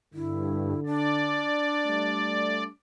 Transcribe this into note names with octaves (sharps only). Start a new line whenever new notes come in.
G2 D3 E4
D4 D5
G3 A3